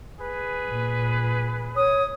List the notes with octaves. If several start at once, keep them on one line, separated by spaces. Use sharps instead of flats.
G#4 B4
A#2
C#5 D#6